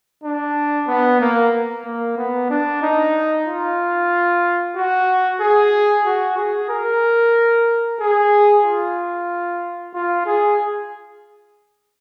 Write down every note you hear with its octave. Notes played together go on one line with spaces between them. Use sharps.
D4
B3
A#3
A#3
B3
D4
D#4
F4
F#4
G#4
F#4
G#4
A#4
G#4
F4
F4
G#4